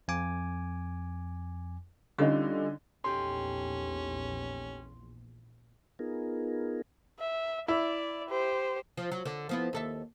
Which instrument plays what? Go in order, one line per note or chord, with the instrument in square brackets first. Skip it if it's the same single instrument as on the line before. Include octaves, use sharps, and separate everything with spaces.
[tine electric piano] F2 G#5 D6
[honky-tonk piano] D3 C#4 D#4 [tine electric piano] G3 F4
[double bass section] A#1 E2 [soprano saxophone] C#4 [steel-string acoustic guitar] D#4 G4 A4 [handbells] C6
[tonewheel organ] B3 D#4 F4 G#4 A#4
[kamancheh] E5
[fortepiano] E4 [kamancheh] D5
[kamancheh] G4 C5
[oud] F3
F#3
D3
F3 B3 E4
D#2 A4 E5